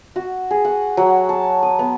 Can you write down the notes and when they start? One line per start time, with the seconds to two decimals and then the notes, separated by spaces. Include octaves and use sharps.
0.16 F#4
0.51 G#4
0.65 F#5
0.97 F#3
1.29 A5
1.63 D#6
1.79 B3